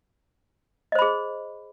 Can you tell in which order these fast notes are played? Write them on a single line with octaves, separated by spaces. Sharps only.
D#5 C5 B5 G#4